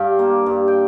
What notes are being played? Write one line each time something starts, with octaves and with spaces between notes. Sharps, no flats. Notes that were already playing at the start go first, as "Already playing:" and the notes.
Already playing: G2 F5 G5
A#3
G2
G5